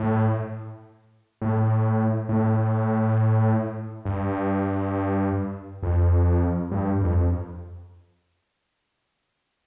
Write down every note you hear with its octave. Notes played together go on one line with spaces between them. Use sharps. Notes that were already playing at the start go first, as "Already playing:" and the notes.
Already playing: A2
A2
A2
G2
F2
G2
F2